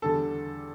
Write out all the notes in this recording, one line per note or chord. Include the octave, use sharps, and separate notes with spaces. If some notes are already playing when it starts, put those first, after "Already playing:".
E2 D3 G3 A4